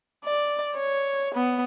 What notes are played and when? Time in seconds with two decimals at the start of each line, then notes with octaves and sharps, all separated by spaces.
0.24 D5
0.75 C#5
1.34 B3